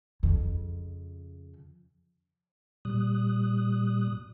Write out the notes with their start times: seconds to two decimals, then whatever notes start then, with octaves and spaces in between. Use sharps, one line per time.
0.23 F2 C#3
2.85 A#2 G3 D#6 F#6